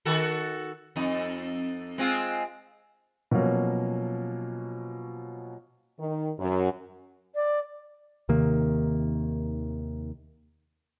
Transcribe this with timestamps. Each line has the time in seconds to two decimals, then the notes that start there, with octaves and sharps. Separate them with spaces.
0.05 D#3 F#4 A4
0.96 F2 D#4
1.98 G#3 C4 F4
3.31 B2 F3 F#3 A#3 C#4
5.99 D#3
6.38 F#2
7.35 D5
8.29 D#2 C3 D#3 A#3